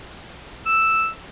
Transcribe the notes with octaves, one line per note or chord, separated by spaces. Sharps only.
E6